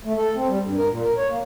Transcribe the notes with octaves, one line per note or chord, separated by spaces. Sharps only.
A3
A4
C4
G3
G2
A#4
A#2
A#4
C#5
A#3